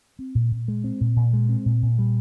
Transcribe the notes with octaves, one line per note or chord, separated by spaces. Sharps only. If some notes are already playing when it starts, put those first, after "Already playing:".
C4
A#2
A#2
G#3
C4
A#2
A#2
G#3
C4
A#2
A#2
G3